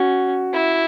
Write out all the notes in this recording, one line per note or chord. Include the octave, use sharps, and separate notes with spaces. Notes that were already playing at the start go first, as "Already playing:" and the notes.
Already playing: C#4 F#4
E4